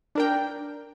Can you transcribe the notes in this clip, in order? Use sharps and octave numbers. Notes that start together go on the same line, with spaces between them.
D4 A#4 G5